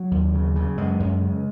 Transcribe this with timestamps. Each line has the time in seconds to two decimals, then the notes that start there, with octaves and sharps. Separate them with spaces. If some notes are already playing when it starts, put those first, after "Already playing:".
Already playing: F#3
0.11 D#2
0.34 C#3
0.56 C#3
0.77 F#2 G#3
1.00 F#2
1.21 C#3